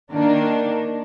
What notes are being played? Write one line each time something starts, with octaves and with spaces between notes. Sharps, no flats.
D#3 A#3 D4